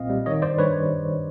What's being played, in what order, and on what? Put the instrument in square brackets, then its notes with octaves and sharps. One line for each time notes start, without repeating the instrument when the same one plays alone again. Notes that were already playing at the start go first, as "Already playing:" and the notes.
Already playing: [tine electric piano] B1 A#2 C4 D#5 F5
G3
D#3 C#5 D#5
G2 C5 D5
G2 B4 C#5